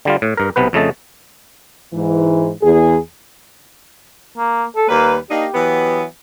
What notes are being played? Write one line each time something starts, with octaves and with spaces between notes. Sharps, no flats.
D3 G3 F4
A2
G2 A#4
B1 C3 B3 B4
F2 C#3 A3 D#5 A5
G#2 E3
E2 G#4
A#3
A4
D#2 G3 A#3 B4
A#3 D4 D#4 G4
E3 F#3 B3